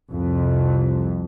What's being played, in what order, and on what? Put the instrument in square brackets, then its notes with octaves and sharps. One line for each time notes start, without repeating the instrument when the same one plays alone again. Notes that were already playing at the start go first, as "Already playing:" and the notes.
[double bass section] C2 F2 C3